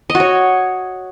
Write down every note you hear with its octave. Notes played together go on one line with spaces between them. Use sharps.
D#5
F#4
C#5